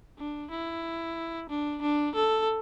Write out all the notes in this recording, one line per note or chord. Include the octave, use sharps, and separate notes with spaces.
D4
E4
D4
D4
A4